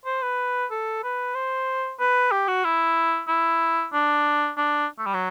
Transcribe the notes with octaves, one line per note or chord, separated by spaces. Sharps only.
C5
B4
A4
B4
C5
B4
G4
F#4
E4
E4
D4
D4
A3
G3
F#3